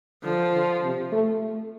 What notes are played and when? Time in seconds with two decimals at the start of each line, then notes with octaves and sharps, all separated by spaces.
0.23 D3 F3
0.52 D3
0.83 C3
1.12 A3
1.42 A3